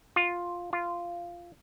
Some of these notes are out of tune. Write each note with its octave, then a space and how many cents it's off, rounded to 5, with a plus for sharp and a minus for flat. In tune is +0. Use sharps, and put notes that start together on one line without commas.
F4 +5
F4 -10